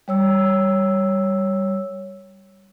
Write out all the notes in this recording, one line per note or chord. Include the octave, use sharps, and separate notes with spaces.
G3 C#5 E6